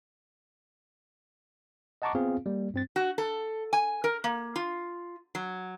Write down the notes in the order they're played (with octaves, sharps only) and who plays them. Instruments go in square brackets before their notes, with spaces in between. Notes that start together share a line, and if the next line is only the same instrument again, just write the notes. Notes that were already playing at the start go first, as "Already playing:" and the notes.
[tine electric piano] D#5 F#5 A5 A#5 C#6 D6
B3 C4 F4 G#4 F5
G3 A#3
G2 C4 A6
[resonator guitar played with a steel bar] F#4
A4
G#5
A#4
A#3
F4
F#3